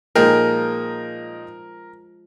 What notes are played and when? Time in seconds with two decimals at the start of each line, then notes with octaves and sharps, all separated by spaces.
0.15 A#2 F3 G#3 D#4 A#4 G5